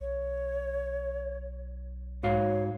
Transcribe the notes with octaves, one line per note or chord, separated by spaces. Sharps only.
B1 C#5
G#2 F#4 C#5 F5